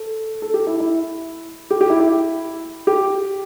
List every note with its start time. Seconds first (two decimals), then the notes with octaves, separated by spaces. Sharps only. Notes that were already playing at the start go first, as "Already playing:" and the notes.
Already playing: A4
0.42 A4
0.54 G4
0.67 E4
0.80 E4
1.71 G4
1.81 G4
1.90 E4
2.00 E4
2.87 G4